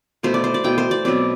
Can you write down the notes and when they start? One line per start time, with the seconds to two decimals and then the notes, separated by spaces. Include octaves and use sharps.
0.23 B2 A3 E4 C5
0.34 D5
0.44 C5
0.54 D5
0.64 B2 A3 E4 G5
0.78 C5
0.91 D5
1.05 B2 F#3 C4 E4 D5